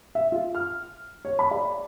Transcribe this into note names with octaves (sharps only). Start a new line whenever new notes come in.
E5
F4
F6
C#5
B5
D5